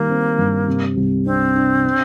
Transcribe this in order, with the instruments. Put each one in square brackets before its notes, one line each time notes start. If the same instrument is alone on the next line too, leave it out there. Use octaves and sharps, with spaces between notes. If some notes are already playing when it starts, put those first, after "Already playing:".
Already playing: [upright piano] D#3 G3 [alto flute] A#3
[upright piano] C4
G2
C3
C2
[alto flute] C4 [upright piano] D4
[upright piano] D4
D4